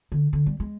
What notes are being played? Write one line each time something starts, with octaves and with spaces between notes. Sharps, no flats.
D3
D3
G3
G#3